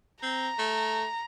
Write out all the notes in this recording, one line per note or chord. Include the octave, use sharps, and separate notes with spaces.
C4 A#5
A3